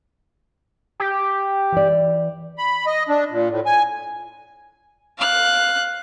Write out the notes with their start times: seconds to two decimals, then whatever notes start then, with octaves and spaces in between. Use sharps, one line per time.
1.00 G4
1.72 E3 D5
2.58 B5
2.87 D#5
3.09 D4
3.31 A#2
3.50 A2
3.66 G#5
5.18 F5 F#6